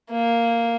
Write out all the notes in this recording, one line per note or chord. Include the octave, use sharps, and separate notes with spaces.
A#3